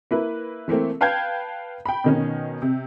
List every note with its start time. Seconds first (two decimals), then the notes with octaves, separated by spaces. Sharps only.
0.11 A#3 E4 B4
0.68 E3 A3 A#3 C4
1.01 B4 F5 G5 A5 G6 G#6
1.86 G5 B5
2.04 B2 D#3 C#4
2.62 C3